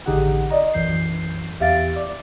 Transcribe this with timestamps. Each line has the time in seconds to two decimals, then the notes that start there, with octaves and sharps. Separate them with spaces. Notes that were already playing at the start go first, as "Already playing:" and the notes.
0.06 A1 D3 D#4 G4 G#4 F#5
0.50 D5 D#5 A#5
0.74 B1 F#2 E3 G6 C7
1.60 E2 G4 E5 F5 A6 D7
1.96 D5